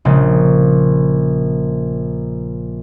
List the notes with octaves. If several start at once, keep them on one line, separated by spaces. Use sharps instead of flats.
A#1 C#3 G#3